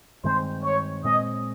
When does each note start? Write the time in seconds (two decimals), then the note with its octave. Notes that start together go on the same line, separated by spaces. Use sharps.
0.24 G2 D#3 G#3 C4 C5
0.64 C#5
1.04 A#2 G#3 C4 D#5